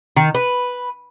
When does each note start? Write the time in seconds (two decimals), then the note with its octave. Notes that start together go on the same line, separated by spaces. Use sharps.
0.16 D#3
0.35 B4